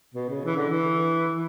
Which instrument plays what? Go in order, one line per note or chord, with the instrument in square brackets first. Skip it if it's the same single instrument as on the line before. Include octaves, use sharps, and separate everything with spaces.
[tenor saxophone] B2
C#3
E3
D3
E3
E3